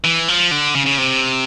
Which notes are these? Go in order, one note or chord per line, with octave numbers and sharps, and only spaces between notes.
E3
F3
D3
C#3
C#3
C3